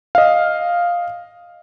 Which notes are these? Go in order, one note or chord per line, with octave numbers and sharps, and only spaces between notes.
D#5 F5